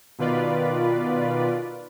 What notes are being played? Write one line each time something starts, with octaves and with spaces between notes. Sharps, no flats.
B2 D#3 F4 B4 D5